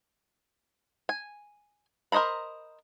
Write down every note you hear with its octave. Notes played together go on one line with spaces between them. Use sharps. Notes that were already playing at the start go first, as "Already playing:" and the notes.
G#5
A#4 C5 D#5 A#5 B5